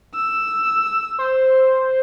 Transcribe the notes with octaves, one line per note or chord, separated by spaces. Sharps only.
E6
C5